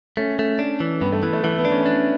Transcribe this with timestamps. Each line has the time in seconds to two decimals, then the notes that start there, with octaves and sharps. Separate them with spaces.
0.17 A3 C#4
0.39 A3
0.59 D4
0.80 E3
1.01 G2 B3
1.12 A3
1.22 E3 B3
1.33 A3
1.44 E3 A3
1.58 B3
1.65 D4
1.72 C#4
1.86 D4